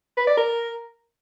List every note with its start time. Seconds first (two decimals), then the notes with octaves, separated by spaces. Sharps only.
0.17 B4
0.27 D5
0.37 A#4